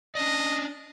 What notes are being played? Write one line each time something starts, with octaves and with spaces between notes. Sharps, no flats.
C#4 D4 D5 D#5